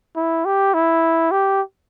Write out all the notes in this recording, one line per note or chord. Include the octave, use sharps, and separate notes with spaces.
E4
G4
E4
G4